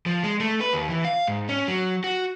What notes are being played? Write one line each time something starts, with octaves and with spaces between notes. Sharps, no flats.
F3
G#3
A3
B4
D#2
E3
F5
G#2
C#4
F#3
F#4